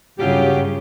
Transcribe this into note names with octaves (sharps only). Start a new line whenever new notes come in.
G2 C#3 F#3 F4 G4